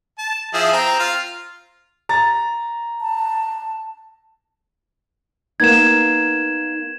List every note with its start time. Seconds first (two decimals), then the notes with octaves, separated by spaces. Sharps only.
0.19 A5
0.54 F3 E4 G#4
0.73 C4 A#5
0.99 F4
2.09 A#5 A6
3.01 A5
5.60 A#3 B3 D#4 G#6 E7